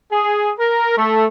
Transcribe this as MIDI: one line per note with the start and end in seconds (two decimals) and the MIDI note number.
0.12 0.50 68
0.59 0.97 70
0.97 1.25 57